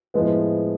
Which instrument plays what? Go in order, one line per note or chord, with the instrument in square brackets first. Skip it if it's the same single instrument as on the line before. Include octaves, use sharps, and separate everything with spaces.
[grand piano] A2 F3 G#3 B3